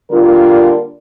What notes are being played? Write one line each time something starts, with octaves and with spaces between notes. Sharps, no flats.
D3 G3 A#3 D4 F4 A#4